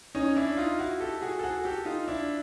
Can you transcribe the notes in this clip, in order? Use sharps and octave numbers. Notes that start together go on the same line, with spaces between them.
C#4 D#4
D4 E4
D#4 F4
E4 F#4
G4 A4
F#4 G#4
A4
F#4 G#4
G4 A4
D#4 F4
D4 E4